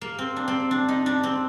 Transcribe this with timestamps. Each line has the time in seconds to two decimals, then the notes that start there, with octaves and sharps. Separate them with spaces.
0.01 A#3
0.19 C4
0.36 D4
0.48 C4
0.71 D4
0.88 D#4
1.06 D4
1.23 C4